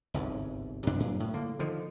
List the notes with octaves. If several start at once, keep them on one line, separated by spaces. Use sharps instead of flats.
G1 C2 G#2
F#2 C3 D4
G2 A#2 F#3
A2
D3 A#3
D3 D#3 F3